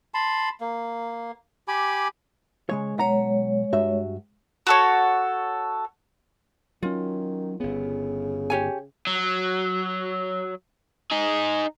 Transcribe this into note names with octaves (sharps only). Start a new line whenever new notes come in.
A5 B5 C6
A#3
G4 G#5 B5 D6
C#3 G#3 C#5
B1 G#3 C#5 F#5 A#5
G2 F#4 E5
F#4 A4 C#5
D#3 F#3 C#4 F4
G1 C#3 B3
G4 C#5 G#5
F#3
D#4 G#4